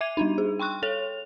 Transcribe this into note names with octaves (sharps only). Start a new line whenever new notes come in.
E5 D6 G#6 D#7 F7
G3 D4 D#4
G#4
G5 C6 C#6 F#6
A4 C#5 F7